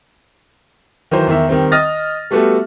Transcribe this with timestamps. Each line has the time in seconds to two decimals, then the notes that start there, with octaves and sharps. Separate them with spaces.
1.11 D#3 E3 F#3 C5
1.27 E2 D#3 E5
1.49 D#3 G3 C4
1.72 D#5 D#6 F6 A6 A#6
2.31 G3 A3 B3 F#4 G4 A4